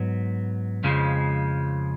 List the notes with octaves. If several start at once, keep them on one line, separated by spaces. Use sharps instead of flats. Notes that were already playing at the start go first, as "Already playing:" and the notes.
Already playing: G#2 F#3 B3
F2 C#3 F3 G#3